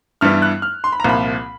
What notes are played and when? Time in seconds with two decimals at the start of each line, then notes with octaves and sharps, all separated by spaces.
0.21 G2 E3 G3 B3 E4 F6
0.42 F#6
0.62 F6
0.84 C6
0.92 B5
1.00 A#5
1.04 C2 A#2 F3 B5